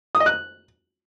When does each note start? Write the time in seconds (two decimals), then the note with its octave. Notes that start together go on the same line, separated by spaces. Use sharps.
0.15 D#6
0.20 D#5
0.26 F#6